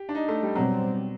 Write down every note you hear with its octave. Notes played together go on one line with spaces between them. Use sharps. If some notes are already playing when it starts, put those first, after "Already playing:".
Already playing: G4
D4
D#4
A3
G3
B2 F#3 G3 C4